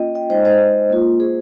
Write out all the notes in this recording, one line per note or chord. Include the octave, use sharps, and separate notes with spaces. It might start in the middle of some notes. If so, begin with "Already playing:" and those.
Already playing: A#3 C#4 F4 D#5 G5
D#5 G5
G#3 D#4 C5 D#5
C5 D#5
A#3 F4
G#4 C5